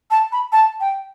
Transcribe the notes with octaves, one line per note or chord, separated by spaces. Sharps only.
A5
B5
A5
G5